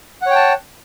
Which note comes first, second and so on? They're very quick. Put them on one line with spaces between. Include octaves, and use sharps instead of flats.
F#5 C#5 G5 A5